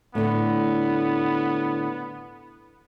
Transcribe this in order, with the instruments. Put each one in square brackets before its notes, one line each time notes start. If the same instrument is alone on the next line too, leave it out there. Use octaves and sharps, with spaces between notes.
[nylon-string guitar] A2 D3 [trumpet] B3